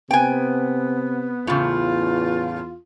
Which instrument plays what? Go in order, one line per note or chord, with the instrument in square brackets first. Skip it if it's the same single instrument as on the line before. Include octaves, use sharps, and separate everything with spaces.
[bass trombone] C3 [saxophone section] B3 [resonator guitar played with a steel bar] G5 G#5
[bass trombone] E2 [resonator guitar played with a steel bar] A2 C#3 [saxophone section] F4